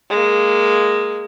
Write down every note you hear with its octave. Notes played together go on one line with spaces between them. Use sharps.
G#3 A#3